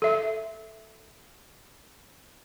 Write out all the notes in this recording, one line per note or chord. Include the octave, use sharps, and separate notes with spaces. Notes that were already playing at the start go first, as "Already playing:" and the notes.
A4 E5